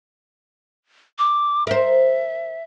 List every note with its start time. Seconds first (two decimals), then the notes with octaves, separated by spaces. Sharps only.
1.18 D6
1.67 A#4 C5 E5